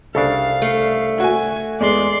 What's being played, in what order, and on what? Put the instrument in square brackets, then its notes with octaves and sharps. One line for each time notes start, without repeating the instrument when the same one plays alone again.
[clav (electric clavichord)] C2 C#3 D4 [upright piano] A4 [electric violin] F5
[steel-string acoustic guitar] A3
[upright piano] F#4 G#5 [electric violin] G#6
[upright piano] E2 G#3 [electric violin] D5 C6